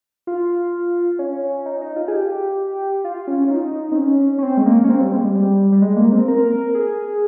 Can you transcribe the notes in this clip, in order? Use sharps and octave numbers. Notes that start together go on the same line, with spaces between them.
F4
C#4
D#4
D#4
F4
G#4
G4
F4
C#4
F4
D#4
C4
C#4
C#4
C4
G#3
A#3
C#4
C4
G3
G#3
G3
G3
G3
G#3
A#3
C4
A#4
G#4